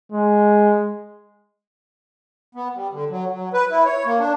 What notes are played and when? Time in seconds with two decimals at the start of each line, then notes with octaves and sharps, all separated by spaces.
0.12 G#3
2.55 B3
2.74 G3
2.93 D3
3.10 F#3
3.32 F#3
3.53 B4
3.70 E4
3.86 C#5
4.06 A#3
4.19 D4